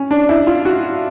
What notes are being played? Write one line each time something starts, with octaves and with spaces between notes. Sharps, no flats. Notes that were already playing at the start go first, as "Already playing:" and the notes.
Already playing: C#4
D4
E4
F4
F#4